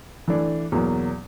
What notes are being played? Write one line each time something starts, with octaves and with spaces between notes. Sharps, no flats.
E3 A3 D4
E2 B2 F#3 A#3